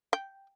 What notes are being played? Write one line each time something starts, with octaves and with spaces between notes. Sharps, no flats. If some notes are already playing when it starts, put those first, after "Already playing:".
G5